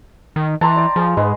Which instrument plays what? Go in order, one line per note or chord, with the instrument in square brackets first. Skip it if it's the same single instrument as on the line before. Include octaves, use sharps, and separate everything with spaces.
[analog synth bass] D#3
[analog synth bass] E3 [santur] A5 A#5 C6
[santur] D5 G5
[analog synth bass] F3 [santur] G#4
[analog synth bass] G#2 [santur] G#4 B4 D#5